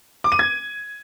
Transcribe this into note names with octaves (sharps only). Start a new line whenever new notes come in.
D6
D#7
G#6